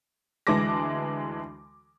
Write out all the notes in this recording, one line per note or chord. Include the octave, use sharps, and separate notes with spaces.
D2 E3 G#3 A5 D6 A#6